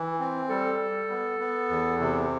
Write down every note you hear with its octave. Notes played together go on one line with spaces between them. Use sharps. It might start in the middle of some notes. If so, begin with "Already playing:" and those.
Already playing: E3
C4
G3 A4
G3
B3
B3
E2
C3